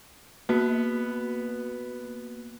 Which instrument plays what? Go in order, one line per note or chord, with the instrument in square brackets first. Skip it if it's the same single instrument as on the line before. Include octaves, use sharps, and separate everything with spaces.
[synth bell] A#3 F#4 [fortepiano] B3